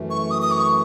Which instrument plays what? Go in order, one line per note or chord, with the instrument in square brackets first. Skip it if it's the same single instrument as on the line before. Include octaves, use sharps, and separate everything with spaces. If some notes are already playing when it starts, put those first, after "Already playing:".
Already playing: [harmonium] F#2 E3 A3
[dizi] C#6
D#6
D#6
C#6